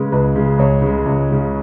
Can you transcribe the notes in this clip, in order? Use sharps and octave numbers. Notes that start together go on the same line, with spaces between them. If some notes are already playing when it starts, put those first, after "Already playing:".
Already playing: C#3 G#3 B4
C#2 B4
C#3 G#3
C#2 C#5
C#3 G#3
C#2
C#3 G#3